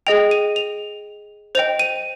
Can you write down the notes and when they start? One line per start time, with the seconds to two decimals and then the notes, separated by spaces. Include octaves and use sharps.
0.07 G#4 D#5 G5 F7
0.31 D#7
0.56 F7
1.55 C5 D#5 G5 F7
1.79 D#7